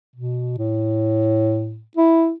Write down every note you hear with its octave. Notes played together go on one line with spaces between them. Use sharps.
B2
A2
E4